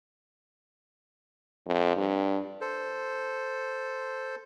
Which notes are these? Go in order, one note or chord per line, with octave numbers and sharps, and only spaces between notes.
F2
G2
A4 C5